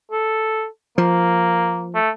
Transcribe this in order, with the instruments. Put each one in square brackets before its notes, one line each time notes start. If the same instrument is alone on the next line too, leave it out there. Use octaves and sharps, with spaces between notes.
[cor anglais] A4
[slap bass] F3 [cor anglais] A#3
[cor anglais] A3